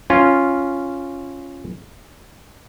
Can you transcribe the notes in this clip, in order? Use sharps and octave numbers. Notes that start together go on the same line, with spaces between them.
C#4 F4